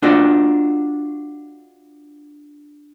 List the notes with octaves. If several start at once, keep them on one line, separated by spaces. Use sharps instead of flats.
D4 F4 F#4 A4 D#5